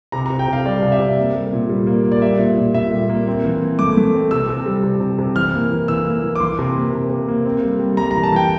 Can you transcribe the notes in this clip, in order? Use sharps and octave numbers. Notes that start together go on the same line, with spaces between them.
C3 A#5
A#5
C3
G5
C3 F5
G3 D5
C3
E5
C3
A#3
G3
A#2
G3
A#3
A#3
D5
G3 E5
A#2
A#2
A#2 E5
G3
A#3
C4
E3
E3
A3 D6
A3
C4
C3 E6
C3
G3
C3
C3
C3
E3 F6
A#3
E3
E3 E6
A#3
E3
D6
E3 C6
C3
A#3
C3
C3
A#3
C4
G3
G3
G3 A#5
A#5
E3
A5
E3 G5